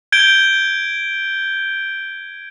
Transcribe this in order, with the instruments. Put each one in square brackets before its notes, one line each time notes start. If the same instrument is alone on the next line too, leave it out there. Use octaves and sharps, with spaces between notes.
[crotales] G6 G#6 D7 G7